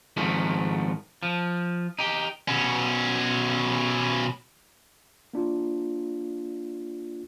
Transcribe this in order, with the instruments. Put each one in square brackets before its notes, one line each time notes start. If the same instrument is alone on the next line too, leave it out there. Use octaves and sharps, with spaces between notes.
[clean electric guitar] G#2 D#3 F3 A3
F3
D#4 G4
[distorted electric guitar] B2 C#4
[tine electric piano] A#3 D4 F4